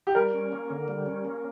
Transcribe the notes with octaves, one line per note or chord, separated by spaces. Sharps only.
G4
G3 A#4
C#4
A#3
D3
G3
C#4
A#3